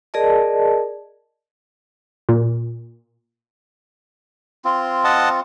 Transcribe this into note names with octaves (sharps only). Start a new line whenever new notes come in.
G#4 A#4 D5 D#5 A5
A#2
C4 F4
D#5 F#5 A5